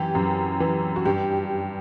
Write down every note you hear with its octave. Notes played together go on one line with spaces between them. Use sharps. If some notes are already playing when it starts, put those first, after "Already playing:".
Already playing: F#2 E3 G4
F#2
E3
F#4
G2 G4